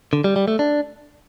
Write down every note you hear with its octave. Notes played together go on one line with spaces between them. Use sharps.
D3
G3
G3
A3
D4